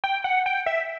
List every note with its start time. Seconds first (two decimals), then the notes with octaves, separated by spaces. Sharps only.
0.04 G5
0.24 F#5
0.46 G5
0.66 E5